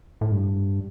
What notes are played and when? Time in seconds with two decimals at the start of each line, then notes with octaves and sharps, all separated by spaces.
0.21 A2
0.32 G2